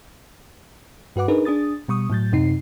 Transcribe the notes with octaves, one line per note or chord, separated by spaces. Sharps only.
G2 F#4 B4 F#5 D6
D4 D#4 G#4 A#4 B4
D4 G#4 D#6 A6
B2 G3 C#6 D#6
A2 F#3 G6 A6
F#2 C3 D#4 C7